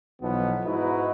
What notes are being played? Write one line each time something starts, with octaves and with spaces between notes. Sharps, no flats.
B1 B2 E3 F3 B3
G#2 D#4 E4 F#4 B4